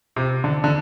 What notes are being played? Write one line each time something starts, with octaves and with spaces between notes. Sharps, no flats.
C3
D3
D3